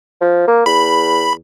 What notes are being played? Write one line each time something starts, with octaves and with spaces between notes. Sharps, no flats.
F3
A#3
E2 B5